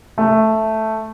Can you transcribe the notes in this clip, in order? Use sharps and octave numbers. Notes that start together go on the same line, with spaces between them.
A3